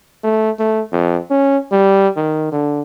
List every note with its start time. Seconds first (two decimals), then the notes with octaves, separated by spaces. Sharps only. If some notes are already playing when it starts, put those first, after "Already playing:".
0.24 A3
0.59 A3
0.92 F2
1.30 C#4
1.72 G3
2.16 D#3
2.52 D3